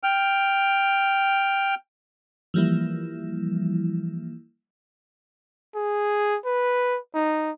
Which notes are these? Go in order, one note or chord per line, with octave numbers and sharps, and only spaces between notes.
G5 F6
E3 F3 G3 A#3 E4
G#4
B4
D#4